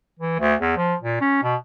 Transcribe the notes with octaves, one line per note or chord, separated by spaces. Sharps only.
E3
D2
E2
F3
A#2
C#4
B2